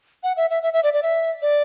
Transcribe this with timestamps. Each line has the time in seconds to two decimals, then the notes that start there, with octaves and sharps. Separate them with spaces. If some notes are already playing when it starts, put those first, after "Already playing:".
0.23 F#5
0.37 E5
0.50 E5
0.63 E5
0.73 E5
0.83 D5
0.93 D5
1.03 E5
1.42 D5